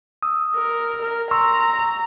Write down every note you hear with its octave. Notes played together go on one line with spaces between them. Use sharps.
D#6 E6
A#4
A#4
A#5 C6 C#6 E6